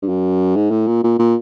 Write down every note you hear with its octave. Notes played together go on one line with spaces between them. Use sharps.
G2
F#2
G#2
A2
A#2
A#2
A#2